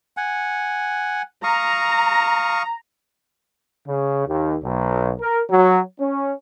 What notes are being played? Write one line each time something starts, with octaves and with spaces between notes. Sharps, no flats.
F#5 G#5
F5 A#5 C#6 D#6
C#3
D#2
B1
A#4
F#3
C#4